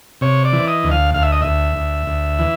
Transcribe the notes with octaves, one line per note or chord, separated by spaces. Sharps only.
C3 C#5
D5
E3
D#5
D2
F5
D2 F5
E5
D#5
D2 E5
D2
D2
E3